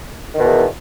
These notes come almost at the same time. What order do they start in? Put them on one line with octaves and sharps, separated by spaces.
D#3 B2 E2